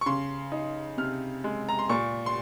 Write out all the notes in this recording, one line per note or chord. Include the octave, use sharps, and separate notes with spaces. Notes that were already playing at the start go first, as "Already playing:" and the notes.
C#6
C#3 C6
D#4
C3 F6
G#3
A#5
C6
A#2 C#6
C6